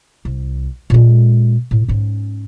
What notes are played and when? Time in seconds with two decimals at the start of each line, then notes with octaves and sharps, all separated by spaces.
0.25 C2
0.90 A#2 G#3
1.71 A2
1.88 G#2 C#4